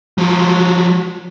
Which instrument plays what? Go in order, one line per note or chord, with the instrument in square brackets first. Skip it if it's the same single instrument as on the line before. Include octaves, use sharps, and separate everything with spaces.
[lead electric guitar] F3 F#3